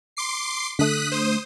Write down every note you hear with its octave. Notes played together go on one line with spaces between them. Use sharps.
C6 D6 C7
D3 A3 D#6 F#6 B6
C5 D#6